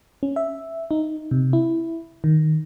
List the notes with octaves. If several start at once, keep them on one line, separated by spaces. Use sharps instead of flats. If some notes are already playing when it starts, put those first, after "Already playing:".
C#4
E5
D#4
C3
E4
D#3